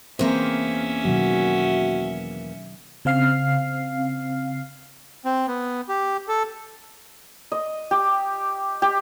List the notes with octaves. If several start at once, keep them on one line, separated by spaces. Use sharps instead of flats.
E2 A#3 C4 C#4 G#4 A#4 C5 E5
B2 D#3 F#3 F#4
C#3 C4 F5 F6 C7
C4
B3
G4
A4
D#5
G4
G4